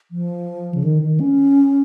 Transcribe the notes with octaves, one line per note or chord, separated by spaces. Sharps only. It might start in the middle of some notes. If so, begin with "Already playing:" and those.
F3
C#3
D#3
D#3
C#4